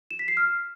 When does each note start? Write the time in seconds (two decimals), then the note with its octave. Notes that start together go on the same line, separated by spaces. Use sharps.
0.11 E7
0.19 B6
0.28 C7
0.37 F6